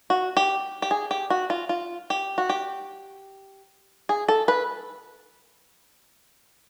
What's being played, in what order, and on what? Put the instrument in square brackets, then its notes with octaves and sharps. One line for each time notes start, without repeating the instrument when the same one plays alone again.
[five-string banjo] F#4
G4
G4
G#4
G4
F#4
F4
F4
G4
F#4
G4
G#4
A4
B4